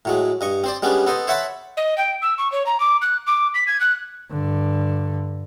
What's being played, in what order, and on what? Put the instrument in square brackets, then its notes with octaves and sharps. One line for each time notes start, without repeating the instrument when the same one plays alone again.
[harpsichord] A2 F#3 G#3
G2 D#5 C#6
C4 C5 D5
G3 G#3 B3 C#4 D4
B3 A4 C5 D#5
C5 C#5 E5 F#5 A5 B5
[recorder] D#5
G5
E6
C#6
C#5
A#5
D6
F#6
D6
B6
G#6
F#6
[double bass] G2 D3